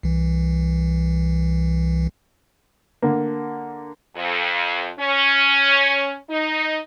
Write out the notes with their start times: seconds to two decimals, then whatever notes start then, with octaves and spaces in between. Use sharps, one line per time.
0.03 C2 E3
3.02 D3 A#3
4.16 F2
4.99 C#4
6.29 D#4